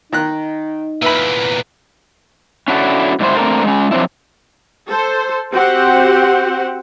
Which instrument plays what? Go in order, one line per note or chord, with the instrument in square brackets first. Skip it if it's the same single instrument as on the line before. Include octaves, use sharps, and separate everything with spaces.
[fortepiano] D#3 A#5 F#6 [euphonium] D#4
[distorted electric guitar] E2 A#2 [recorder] B4 [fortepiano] E5 B5
[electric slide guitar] C#4 D4 E4 F#4 G4 A4
G#2 G3 D4 E4 C5
A3 C4 D4 A4 A#4
G#3 C#4
F3 F#3 C4 D4 E4
[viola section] A4 C5
C4 F#4 G4 C5 F#5